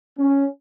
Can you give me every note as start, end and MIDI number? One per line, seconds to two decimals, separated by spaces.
0.18 0.46 61